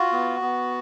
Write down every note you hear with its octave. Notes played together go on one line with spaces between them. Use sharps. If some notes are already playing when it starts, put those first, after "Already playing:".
Already playing: F4 F#4
B3
B3